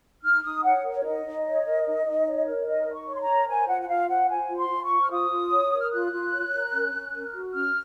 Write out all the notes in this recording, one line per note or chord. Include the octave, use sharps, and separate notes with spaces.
D#4 F6
D#4 D#6
C#5 F#5
A#4
C#5
D#4 D#5
D#4
C#5
A#4
D#4
D#4
C#5
A#4
D#4 D#5
D#4
C#6
C#5
C6
A#5
A#4
C5 G#5
F4 F#5
F#5
F4 F5
C5 F#5
C5 G#5
F4
C6
F4
C#6
C5
F6
F4 D#6
F4
C#5
A#4
F6
F4 F#6
F4
C#5
A#4
C#4
C#4
A#4
F#4
C#4 F6